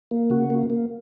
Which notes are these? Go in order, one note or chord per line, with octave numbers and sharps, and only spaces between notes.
A#3
C#3 F#4
A#3
A#3